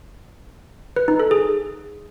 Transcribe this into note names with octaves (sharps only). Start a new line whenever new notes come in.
B4
D#4
A4
G#4